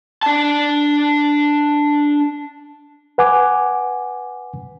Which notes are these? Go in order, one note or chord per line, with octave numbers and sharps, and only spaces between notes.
D4 A5
B4 F#5 G#5 D6